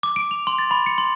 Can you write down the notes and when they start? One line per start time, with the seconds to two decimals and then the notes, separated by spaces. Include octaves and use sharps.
0.03 D6
0.16 D7
0.31 F7
0.47 C6
0.59 A6
0.71 B5
0.86 C#7
0.98 C6